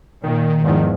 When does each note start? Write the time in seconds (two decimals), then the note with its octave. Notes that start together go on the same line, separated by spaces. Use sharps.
0.24 A#2 D#3
0.63 E2 G#2 F3